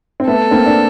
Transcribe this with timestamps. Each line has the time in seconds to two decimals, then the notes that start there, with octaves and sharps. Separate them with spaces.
0.20 C4
0.27 A3 B3 A4
0.51 A#3 C4
0.66 D4